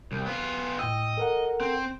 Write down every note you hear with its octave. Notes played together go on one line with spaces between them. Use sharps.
C2
B3 F4
A2 D#5 G5 E6
A4 A#4 F#5
C4